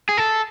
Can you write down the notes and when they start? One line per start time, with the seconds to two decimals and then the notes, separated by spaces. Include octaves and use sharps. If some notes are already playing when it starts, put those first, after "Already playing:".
0.09 G#4
0.17 A4